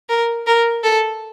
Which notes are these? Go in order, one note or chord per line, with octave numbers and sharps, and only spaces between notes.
A#4
A#4
A4